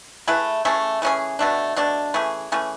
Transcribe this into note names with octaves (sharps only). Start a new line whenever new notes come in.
A3 E4 G#4 B4
E3 A3 C#4 G#4
E3 A3 C#4 G#4
B2 A3 D4
B2 A3 D4
E3 A3 C#4 G#4
E3 A3 C#4 G#4